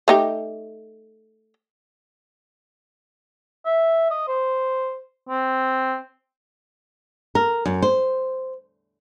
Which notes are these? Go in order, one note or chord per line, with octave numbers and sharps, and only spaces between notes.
A3 D#4 G4
E5
D#5
C5
C4
A#4
F#2
C5